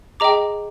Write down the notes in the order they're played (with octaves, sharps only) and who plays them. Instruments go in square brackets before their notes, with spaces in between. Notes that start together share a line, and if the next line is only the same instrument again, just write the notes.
[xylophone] G#4 D#5 G5 A#5 D6